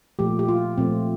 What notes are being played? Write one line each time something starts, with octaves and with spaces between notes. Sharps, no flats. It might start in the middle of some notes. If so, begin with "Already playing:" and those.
A#2 F3 A3 G4
G4
F4
A#2 F3 A3 C4